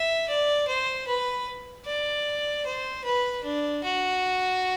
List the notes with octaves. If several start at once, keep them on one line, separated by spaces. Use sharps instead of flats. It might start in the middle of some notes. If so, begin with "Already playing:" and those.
Already playing: E5
D5
C5
B4
D5
C5
B4
D4
F#4